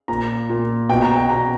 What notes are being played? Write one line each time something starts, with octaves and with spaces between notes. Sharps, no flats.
A#2 A#5
A#2
B2 G5
A#5
G5
B2 A#5